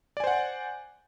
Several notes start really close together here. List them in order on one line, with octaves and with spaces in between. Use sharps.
D5 G#5 C5 F#5